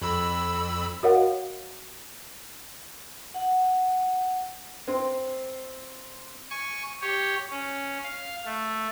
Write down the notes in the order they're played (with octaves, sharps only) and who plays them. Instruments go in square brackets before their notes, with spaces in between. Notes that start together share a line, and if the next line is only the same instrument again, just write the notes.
[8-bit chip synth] F2 B5 E6
[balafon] F#4 A#4 C#5 D#5 F5 F#5
[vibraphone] F#5
[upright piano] C4 C5
[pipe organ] G#5 C#6
G4 C#5
C#4
F5
A3